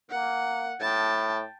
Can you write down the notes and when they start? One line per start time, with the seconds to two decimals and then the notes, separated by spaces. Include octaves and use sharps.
0.11 A#3 F#5
0.81 A2 G5 A5